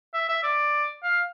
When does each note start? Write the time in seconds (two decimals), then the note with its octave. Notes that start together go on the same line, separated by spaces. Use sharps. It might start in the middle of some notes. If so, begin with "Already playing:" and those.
0.14 E5
0.29 E5
0.43 D5
1.03 F5